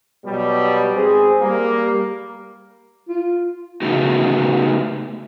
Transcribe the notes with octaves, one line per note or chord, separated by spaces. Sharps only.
B2 F#3 G3
G#1 C4 G#4
G3 A#3
F4
C#3 A3 B3 D#4 F#4